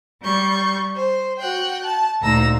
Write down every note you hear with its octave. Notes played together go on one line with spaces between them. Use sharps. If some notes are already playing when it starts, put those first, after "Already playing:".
G3 C#6 G6
C5
F#4 F#5 G5
A5
D2 A#2 D#4 A#5 E6 A#6